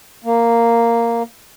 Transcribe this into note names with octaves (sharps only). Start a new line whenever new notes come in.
A#3